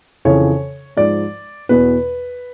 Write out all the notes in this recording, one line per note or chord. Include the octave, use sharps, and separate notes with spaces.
F2 C#3 E3 C#5
G#2 F3 D5
E2 B2 B4